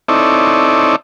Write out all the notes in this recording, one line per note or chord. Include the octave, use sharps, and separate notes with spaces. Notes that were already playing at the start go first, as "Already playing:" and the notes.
C4 D#4 E4 A4 C#5 D5